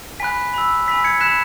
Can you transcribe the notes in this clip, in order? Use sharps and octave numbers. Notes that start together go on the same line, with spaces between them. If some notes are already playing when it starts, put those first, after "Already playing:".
G#5 B5 F#6 B6
B5 E6
G#5 B5 E6 B6
G#6 C#7
B5 F#6 B6 E7